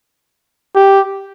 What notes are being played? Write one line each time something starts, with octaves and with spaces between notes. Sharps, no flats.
G4